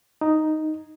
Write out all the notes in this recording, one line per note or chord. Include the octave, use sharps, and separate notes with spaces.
D#4